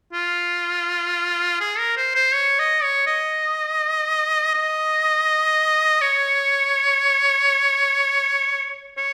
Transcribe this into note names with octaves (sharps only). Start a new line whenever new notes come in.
F4
G#4
A#4
C5
C5
C#5
D#5
C#5
D#5
D#5
C#5
C#5